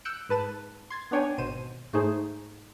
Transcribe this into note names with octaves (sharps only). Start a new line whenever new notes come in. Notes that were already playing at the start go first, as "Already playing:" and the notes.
E6 F#6 G6 C#7 D7
G#2 B4 A5 E7
C6 G#6 A6
B3 D4 C#5 G5 G#5
G#1 B2 C5 D#7 E7
G#2 A3 D#4 G#4 C5